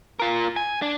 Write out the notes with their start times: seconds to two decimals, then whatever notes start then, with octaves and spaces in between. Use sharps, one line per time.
0.20 F4 A#4
0.56 G#5
0.82 D4